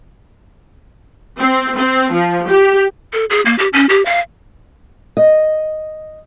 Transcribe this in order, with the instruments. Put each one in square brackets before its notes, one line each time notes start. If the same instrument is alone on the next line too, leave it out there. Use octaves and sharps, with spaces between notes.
[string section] C4
C4
F3
G4
[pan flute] A4
G#4
A#3
G4
C#4
G4
F5
[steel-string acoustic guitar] D#5